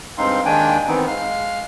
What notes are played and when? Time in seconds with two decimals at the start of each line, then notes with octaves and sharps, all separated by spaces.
0.18 G2 G#3 C4 D#4 F5 C6
0.46 D#2 D#3 G#3 D4 G5 G#5
0.88 D#3 E3 B3 C4 D#4
1.08 G#3 F5 F6